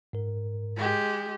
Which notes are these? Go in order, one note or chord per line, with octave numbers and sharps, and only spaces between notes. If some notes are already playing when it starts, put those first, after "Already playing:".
G#2 A#4
G#3 G4